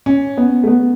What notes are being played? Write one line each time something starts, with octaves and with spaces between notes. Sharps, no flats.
C#4
B3
A3
B3